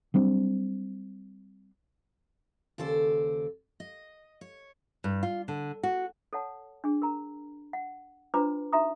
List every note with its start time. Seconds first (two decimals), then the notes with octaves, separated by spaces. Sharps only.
0.14 F#3 G3 C4 D4
2.78 D#2 C#3 A4 C5 D5
3.80 D#5
4.41 C#5
5.04 G2
5.23 F4
5.48 D3
5.83 F#4
6.33 A4 C#5 F#5 A5
6.84 D4 G#4
7.02 A#4 A#5
7.73 F#5
8.34 D4 F4 B4 C5 A#5 D6
8.73 D#4 F#4 E5 A#5 D#6